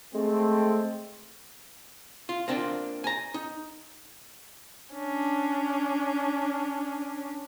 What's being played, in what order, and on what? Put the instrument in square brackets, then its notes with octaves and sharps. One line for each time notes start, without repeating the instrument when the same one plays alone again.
[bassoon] G#3 [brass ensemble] A3 C4
[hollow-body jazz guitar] F4
A#3 C4 D4 F4
G#5 A#5
D#4
[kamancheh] C#4 D4